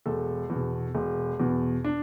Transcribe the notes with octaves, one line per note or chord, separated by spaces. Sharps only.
E1 A4
E2
B2
E1
E2 B2
D4